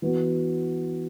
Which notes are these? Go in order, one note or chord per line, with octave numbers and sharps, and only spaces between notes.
E3 B3 F#4